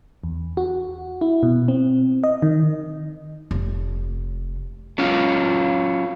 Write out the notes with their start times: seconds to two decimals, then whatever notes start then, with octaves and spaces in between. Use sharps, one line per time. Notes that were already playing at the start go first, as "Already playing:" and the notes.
0.24 E2
0.57 F#4
1.21 E4
1.43 B2
1.68 C4
2.24 D#5
2.42 D#3
3.51 F1
4.98 F#3 C#4 F4 F5